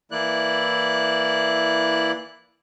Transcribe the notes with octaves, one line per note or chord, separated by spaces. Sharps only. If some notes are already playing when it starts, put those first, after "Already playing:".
E3 A#3 E4 D5 F#6